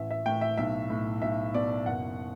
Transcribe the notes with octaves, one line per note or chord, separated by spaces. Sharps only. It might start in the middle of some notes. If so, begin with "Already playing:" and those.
Already playing: A1 E5
E5
A2 G5
E5
B1 E5
A2
B1 E5
B2 D5
F#1 F#5